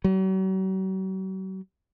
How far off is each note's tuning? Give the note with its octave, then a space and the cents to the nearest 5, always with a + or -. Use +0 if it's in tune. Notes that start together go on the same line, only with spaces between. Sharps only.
F#3 +45